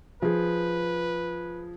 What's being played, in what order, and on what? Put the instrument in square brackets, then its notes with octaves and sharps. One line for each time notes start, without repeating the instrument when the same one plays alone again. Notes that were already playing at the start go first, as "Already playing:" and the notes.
[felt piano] F3 G#4 [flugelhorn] B4